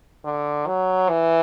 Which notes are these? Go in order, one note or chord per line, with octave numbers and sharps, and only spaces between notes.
D3
F#3
E3